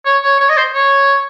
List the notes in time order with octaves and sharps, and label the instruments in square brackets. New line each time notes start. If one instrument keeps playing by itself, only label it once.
[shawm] C#5
C#5
C#5
D#5
C5
C#5